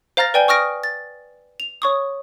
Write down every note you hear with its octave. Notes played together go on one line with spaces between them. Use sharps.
C5 F5 A#5 F6 A6 A#6
B4 D5 G5 G#5 G6 G7
C#6 D#6 F6 A#6 D7
A6
F7
C#5 C#6 D#6